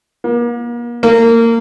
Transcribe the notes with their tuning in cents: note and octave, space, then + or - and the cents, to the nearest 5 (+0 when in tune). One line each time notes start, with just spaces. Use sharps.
A#3 +40
A#3 -20